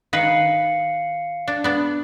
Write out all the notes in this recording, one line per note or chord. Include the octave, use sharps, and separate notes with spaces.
D#3 B4 F5 C7 C#7
D4
B3 D4